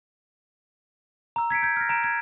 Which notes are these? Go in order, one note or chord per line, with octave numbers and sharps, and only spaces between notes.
A#5 E6
G#6 B6 C#7 D7
G6 G#6
F6 A#6
A#5 D7 E7
G#6